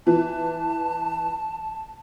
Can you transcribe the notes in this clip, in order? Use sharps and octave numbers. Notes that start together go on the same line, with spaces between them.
E3 A5